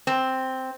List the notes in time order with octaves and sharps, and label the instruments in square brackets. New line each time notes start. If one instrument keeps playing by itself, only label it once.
[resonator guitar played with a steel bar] C4